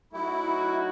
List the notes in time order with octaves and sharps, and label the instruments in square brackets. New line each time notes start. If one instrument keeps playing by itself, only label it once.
[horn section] F#3 A3 D#4 F#4 [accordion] E4